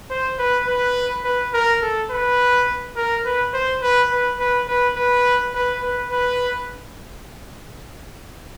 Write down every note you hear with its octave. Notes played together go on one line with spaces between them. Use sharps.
C5
B4
B4
B4
A#4
A4
B4
A#4
B4
C5
B4
B4
B4
B4
B4
B4
B4
B4